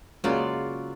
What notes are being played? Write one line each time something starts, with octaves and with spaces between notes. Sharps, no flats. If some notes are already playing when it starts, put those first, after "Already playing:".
C#3 F#3 G#3 A#3 C#4 F4 D5